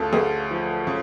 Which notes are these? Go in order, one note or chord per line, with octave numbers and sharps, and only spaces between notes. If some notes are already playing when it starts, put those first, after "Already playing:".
Already playing: D2 C#3 F4 G#4 A4
D2 G#4
F3
C#3